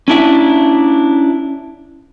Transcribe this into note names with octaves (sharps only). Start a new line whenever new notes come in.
C#4 D4 E4 E5